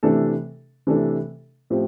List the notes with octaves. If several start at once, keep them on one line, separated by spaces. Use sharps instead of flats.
C3 E3 A3 D4 A4
C3 E3 A3 D4 A4
A2 F3 C4 G4